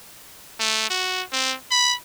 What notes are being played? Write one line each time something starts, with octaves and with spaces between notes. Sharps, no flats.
A3
F#4
C4
B5